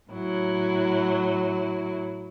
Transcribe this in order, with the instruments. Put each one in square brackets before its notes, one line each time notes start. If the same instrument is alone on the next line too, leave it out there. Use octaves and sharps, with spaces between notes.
[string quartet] A2 F#3 E4